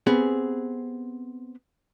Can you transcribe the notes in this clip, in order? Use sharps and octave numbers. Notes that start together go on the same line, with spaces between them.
B3 C4 G4 G#4